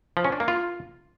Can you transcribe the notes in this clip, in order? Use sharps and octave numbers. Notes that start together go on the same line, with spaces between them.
F3
C#4
D4
A#3
F4